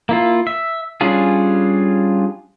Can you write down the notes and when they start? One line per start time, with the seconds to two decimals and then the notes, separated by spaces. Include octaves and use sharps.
0.09 A#3 E4 F4
0.47 E5
1.01 G3 C#4 D4 F4 G#4